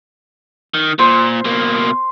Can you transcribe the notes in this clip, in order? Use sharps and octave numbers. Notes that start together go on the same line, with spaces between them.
D#3
A#2 C5
B2 A#3